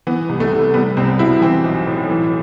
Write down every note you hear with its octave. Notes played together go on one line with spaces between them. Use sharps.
E3 B3
C2
A3
C3
G3 B3
C2 C4
B2 E4
E3 C4
B1
A2
E3